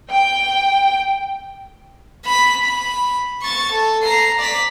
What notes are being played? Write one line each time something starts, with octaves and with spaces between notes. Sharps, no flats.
G5
B5 B6
B5
C#6 A6
A4
A#5 C7
D5 B6